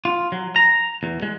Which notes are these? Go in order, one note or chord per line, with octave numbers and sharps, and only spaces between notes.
F4
F#3
A#5
E2
G#3